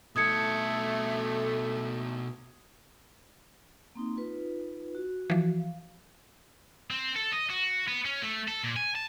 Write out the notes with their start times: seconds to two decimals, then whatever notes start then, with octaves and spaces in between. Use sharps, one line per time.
0.16 B2 A3 A4 D#6 G#6 C#7
3.95 A#3 C4 D#4
4.16 D#4 F4 B4
4.95 F#4
5.30 E3 F3
5.59 F5
6.91 C4
7.16 A4
7.33 D#5
7.50 F#4
7.88 B3
8.05 C#4
8.22 A3
8.48 A4
8.63 A#2
8.76 G#5
8.95 A5